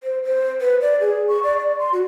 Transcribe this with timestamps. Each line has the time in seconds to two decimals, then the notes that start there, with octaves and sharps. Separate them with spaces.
0.03 C5
0.24 C5
0.61 B4
0.82 D5
1.00 G#4
1.28 C#6
1.43 D5
1.58 D5
1.79 C6
1.93 F#4